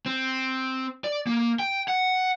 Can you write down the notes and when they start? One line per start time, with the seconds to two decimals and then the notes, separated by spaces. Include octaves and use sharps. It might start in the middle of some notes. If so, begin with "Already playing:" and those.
0.06 C4
1.04 D5
1.27 A#3
1.59 G5
1.88 F#5